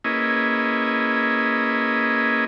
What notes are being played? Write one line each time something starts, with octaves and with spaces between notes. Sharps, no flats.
A#3 C#4 E4 G#4 B4 D#5